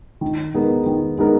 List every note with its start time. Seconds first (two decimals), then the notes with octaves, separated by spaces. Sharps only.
0.21 D#3
0.54 G#3 B3 D#4 A#4
0.86 D#3
1.19 G#3 B3 D#4 A#4